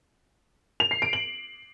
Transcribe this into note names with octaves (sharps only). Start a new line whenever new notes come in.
F7
C7
D7
F#7